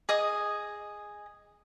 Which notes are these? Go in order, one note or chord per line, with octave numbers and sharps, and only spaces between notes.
G#4 D#5 D#6